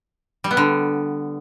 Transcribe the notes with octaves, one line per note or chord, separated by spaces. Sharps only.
G3
B3
D3